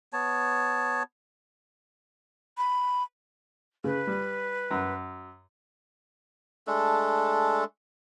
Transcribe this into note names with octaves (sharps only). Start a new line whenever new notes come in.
B3 C#5 A5
B5
C#3 B4
G3
F#2
G#3 A3 D4 A4